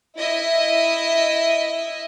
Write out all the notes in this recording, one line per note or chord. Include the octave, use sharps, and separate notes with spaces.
E4 D#5 E5